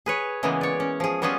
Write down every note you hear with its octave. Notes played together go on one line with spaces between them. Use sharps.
G#4 B4 C#5
C#3 E3 G#3 A#3 B3
C#5 D5
C#4
F3 G#4
G3 B3 C#4 F4 G#4